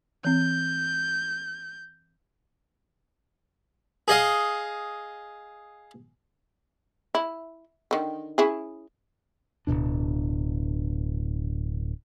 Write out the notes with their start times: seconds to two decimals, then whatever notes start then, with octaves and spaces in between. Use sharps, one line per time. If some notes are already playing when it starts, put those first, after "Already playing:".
0.25 E3 C4 G6
4.08 G#4 D#5 F5
7.15 E4
7.91 D3 D#3
8.38 C#4 E4 G#4
9.67 D1 C2 B2 D4